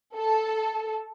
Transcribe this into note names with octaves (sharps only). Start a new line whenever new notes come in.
A4